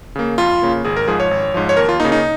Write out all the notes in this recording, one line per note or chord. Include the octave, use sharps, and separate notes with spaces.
C#3 A#3
F2 F4
C#3 A#3
G#1 G#4
A#4
G#2 F3 G#4
C#5
G#1
G#2 F3
C#5
D#2 A#4
F4
C#3 A#3 D#4
D#4